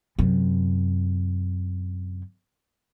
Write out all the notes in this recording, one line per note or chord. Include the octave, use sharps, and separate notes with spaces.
F#2 C3